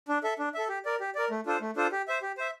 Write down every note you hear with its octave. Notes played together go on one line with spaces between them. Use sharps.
D4
A4 E5
D4
A4 E5
G4
A#4 D5
G4
A#4 D5
A3
D4 F4 A4 C5
A3
D4 F4 A4 C5
G4
C5 E5
G4
C5 E5